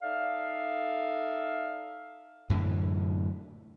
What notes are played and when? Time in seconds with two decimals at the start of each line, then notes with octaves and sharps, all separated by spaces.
0.02 D#4 A4 D5 E5 F5
2.50 F#2 A2 D3 E3